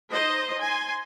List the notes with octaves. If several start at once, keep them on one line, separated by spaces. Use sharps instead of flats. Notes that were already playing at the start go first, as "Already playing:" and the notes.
D#4 C5 D#5
G#5 C6